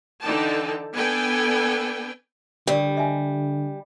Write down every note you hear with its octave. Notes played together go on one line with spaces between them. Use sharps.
D3 E3 D#4 D5 G5 A5
B3 D4 A4 B4 G5 G#5
D3 G3 G4 A#4 D5
D#5 E5 G#5